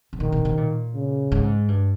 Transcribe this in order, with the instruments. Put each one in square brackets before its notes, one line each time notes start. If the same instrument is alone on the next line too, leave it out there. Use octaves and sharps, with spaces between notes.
[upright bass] C3
[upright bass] A#2 [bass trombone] D#3
[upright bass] A#2
C3
A#2
[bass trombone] C#3
[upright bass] G#2
G2